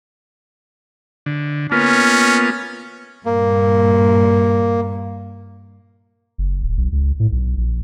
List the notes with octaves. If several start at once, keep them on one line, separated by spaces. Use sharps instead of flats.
D3
A#3 B3 C#4 F4
G2 A#2 A#3
F#1
D1
B1
C#2
A2
B1
A#1